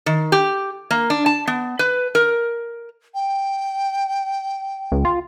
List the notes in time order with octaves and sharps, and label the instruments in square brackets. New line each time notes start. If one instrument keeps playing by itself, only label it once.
[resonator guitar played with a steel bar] D#3
G4
A#3
D4
A5
B3
B4
A#4
[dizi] G5
[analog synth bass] C#2
F4